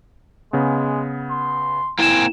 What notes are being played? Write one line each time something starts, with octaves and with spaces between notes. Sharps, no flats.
C#3 G#3 B3
C6
A#3 C4 E4 G#5 E7